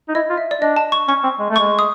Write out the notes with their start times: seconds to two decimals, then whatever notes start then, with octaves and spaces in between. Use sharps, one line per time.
0.09 D#4
0.15 E4 D#5
0.30 F4
0.37 E5
0.51 D5
0.61 D4 D#5
0.76 A5
0.92 C#6
1.08 C#4 C#6
1.23 C4
1.39 G#3
1.50 A3
1.56 G#3 C#6
1.79 D#6